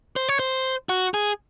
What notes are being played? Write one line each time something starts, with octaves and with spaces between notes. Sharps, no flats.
C5
C#5
C5
F#4
G#4